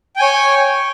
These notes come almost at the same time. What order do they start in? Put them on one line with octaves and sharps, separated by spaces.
G5 G#5 C#5